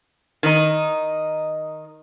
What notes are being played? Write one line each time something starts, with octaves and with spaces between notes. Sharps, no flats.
D#3 D#4